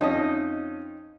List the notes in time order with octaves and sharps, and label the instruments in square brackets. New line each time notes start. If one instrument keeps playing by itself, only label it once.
[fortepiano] F2 C#4 A5 [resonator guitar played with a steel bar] D#4 D#5